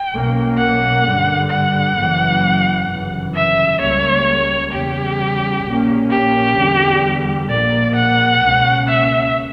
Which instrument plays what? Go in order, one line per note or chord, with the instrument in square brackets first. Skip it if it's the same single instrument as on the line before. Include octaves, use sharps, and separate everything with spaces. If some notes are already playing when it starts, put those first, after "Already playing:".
Already playing: [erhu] G5
[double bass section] B1 B2 A#3 C#4
[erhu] F#5
[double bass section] G2 D3 G3
[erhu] F#5
[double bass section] F#1 F#2 E3
G1 F#2 C#3 E3
[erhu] E5
[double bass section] C#2 C#3 G3 A#3 [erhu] C#5
[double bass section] E2 C#3 G3 [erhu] G4
[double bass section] A#1 A#2 A#3 C#4
[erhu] G4
[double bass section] E2 D3 G3
[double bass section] A#1 A#2 A#3 [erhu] D5
[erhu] F#5
[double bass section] C#2 B2 A#3 C#4
[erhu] E5